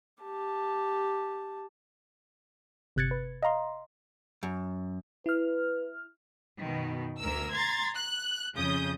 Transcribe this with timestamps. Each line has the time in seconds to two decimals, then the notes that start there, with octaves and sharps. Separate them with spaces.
0.22 G4 A5
2.96 G1 C3 F#6 G#6 A6 C#7
3.11 B4
3.43 D#5 F5 A#5 C6
4.43 F#2
5.26 E4 B4 F6
6.62 F#2 B2 D#3
7.20 D2 A#4 E6
7.53 A#5 C6 G#6 A6
7.95 F#6
8.54 F2 C#3 D#6 G6